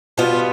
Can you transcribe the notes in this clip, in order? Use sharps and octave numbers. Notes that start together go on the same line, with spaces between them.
B2 G3 B3 F4